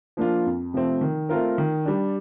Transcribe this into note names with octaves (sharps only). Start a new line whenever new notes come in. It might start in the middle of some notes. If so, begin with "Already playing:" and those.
F3 A#3 D4 F4
F2
C3 F3 A3 C4
D#3
A3 C4 F4 A#4
D#3
G3 D4